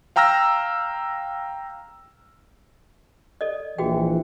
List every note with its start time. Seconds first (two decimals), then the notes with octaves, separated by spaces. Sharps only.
0.16 F5 G5 A#5 E6 F6 A#6
3.41 A4 D5 D#5
3.78 A#1 E3 F#4 G#4 G5